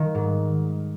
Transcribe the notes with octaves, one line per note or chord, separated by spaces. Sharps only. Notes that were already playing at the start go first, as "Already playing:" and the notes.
Already playing: D#3
G#2